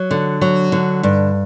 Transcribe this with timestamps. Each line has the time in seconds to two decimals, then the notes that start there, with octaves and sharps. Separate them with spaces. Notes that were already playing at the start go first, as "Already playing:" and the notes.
Already playing: F#3
0.11 D3
0.41 F#3
0.72 D3
1.03 G2